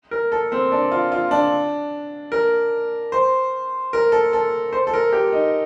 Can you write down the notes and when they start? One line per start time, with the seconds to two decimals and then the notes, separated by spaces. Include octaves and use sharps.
0.11 A#4
0.32 A4
0.52 C4
0.72 D4
0.92 F4
1.12 F4
1.31 D4
2.32 A#4
3.12 C5
3.93 A#4
4.12 A4
4.33 A4
4.73 C5
4.87 A4
4.94 A#4
5.13 G4
5.33 D#4